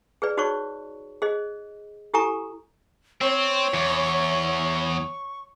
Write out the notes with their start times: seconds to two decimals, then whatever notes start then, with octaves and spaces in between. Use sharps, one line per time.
0.22 G#4 B4 D5
0.37 D#4 F#4 G#4 C5 C#5 C#6
1.22 G#4 C5 D#5
2.14 E4 G4 A4 G#5 A#5 C#6
3.21 C4 C#5 C#6
3.74 E2